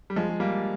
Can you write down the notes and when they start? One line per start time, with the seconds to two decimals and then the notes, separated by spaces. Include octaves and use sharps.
0.10 G3
0.16 F3 G#3
0.29 G#3
0.40 G3 A#3